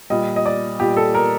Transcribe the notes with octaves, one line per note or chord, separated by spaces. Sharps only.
A#2 G3 D#5
D#5
D5
A#2 G3 G4
A4
A#4